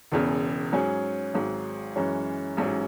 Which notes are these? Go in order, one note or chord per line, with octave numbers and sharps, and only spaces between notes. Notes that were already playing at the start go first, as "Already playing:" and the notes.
E1 E2 C#3
G#2 F#3 C#4 G#4
G#1 G#2 F#3
F#2 E3 G#3 C#4
A1 G#2 F#3 C#4